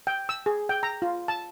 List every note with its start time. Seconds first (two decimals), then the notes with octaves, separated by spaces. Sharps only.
0.07 G5
0.29 E6
0.46 G#4
0.69 G5
0.83 A#5
1.02 F4
1.28 A5